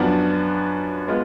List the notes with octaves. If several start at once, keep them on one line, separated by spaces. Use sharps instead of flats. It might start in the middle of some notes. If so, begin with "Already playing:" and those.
Already playing: F#2 F3 B3 D4 F#4
G#3 B3 F4